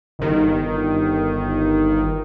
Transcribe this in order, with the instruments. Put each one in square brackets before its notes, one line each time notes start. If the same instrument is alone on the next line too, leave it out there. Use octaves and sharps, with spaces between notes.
[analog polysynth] G1 D#3